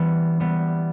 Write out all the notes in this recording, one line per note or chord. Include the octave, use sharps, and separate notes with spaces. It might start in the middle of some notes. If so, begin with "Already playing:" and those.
Already playing: E3 G3 B3
G3 B3